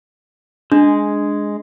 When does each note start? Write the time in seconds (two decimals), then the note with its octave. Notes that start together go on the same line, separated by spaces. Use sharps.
0.72 G#3 D4